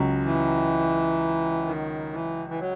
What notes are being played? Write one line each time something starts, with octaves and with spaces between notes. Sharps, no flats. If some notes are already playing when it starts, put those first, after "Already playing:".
Already playing: C#2 C#3 F#3 C#4
E3
D#3
E3
E3
F#3